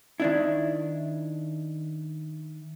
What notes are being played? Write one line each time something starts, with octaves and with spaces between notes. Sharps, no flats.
D#3 D4 E4